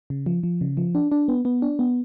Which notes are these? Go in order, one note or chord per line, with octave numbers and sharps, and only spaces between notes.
C#3
F3
F3
C#3
F3
D4
D4
B3
B3
D4
B3